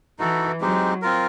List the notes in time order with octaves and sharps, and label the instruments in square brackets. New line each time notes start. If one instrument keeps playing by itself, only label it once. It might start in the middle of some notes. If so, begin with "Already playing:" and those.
[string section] E3 [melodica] D#4 F#4 A4
[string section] F#3 [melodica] G#3 C4 D#4 G4
[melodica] C4 F4 A#4